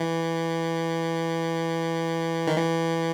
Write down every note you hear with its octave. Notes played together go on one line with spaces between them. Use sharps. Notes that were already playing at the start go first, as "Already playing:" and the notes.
Already playing: E3
D#3
E3